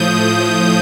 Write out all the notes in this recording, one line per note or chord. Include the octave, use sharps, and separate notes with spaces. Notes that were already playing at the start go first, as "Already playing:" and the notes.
Already playing: A2 F3 D#6 G6